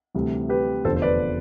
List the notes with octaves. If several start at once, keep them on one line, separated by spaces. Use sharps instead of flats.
D2 C3 E3 G3
G4 B4
F1 E2 D3 F3 A4 C5
C5
B4 D5